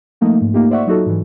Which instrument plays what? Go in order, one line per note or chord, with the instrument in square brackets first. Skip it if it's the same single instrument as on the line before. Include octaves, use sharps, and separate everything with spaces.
[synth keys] F3 A3 A#3 D#4
G#2
A3 A#3 D#4 F4 G4
C5 D5 E5 F#5 C#6
F#3 D#4 F4 F#4 A4
G#2 E3